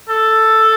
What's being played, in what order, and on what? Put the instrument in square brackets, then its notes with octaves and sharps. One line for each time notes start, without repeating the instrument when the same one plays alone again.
[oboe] A4